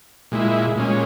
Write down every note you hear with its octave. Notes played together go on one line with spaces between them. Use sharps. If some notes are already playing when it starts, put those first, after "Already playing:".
A#2 G#3 E4
A#2 G#3 C#4